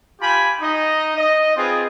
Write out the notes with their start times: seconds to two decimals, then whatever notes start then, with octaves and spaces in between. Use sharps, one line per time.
0.21 F4 G4 G#5 B5
0.61 D#4 D#5
1.17 D#5
1.57 C4 F4 G#4 B4